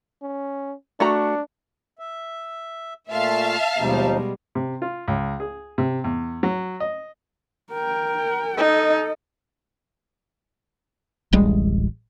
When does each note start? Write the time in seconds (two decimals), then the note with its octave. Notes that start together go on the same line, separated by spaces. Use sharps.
0.22 C#4
1.00 A3 D4 F#4 A#5
1.99 E5
3.09 A#2 A3 F4 E5 F5 A5
3.78 D#2 B2 F3 G3 G#3 D#4
4.55 C3
4.82 F4
5.08 C#2
5.40 G#4
5.78 C3
6.04 E2
6.43 F#3
6.80 D#5
7.72 A#4 G5
8.58 D#4 A4 D#5
11.33 D1 A1 G3 G#3